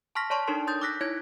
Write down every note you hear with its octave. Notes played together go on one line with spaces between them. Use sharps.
A5 C6 C#6 F6 A#6 B6
C#5 D5 A5 C6 C#6
D4 D#4 A4 A#4 C#5 C6
C6 D#6 G6 A6
D6 E6 F#6 A#6 B6
D#4 E4 C#5 G#6